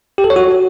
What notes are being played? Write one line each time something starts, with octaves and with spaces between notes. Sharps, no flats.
G4
A4
C#5
F#4